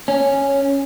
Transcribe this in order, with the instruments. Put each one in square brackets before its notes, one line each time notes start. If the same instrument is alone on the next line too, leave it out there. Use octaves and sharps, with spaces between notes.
[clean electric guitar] C#4